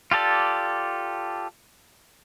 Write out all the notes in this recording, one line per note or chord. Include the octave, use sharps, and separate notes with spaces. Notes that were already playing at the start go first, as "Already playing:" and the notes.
F4 G4 A4 D5